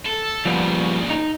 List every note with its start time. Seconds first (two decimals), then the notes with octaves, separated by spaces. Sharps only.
0.06 A4
0.45 A#2 C#3 F3 G3 B3
1.10 D#4